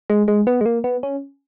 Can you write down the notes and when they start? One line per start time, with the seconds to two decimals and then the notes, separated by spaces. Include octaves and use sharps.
0.10 G#3
0.28 G#3
0.47 B3
0.61 G#3
0.66 A#3
0.84 B3
1.03 C#4